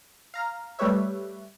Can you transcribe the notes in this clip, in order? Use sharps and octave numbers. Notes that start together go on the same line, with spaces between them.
F5 A#5
G3 A3 G4 B4 C#5 E5